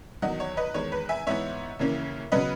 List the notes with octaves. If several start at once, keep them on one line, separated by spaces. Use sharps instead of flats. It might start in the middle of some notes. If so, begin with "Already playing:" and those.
E2 D#3 F#3 D#5 F#5
C#5
B4 D#5
E2 D#3 G#3 C#5
B4
E5 G#5
G#2 E3 B3 C#5 E5
D#2 C#3 E3 A#3 C#4
C#3 F#3 B3 B4 D#5